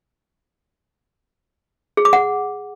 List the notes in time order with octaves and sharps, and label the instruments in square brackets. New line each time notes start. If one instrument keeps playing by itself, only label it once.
[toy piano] G#4
D6
F#5